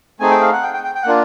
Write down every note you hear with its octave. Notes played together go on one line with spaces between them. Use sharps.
A3 C4 D#4 G#4 G#5
G5
F5
F#5
G5
G5
G5
G5
F#5
A#3 D4 F4